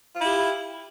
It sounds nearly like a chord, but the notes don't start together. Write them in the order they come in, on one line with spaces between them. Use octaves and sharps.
F4 E4 G4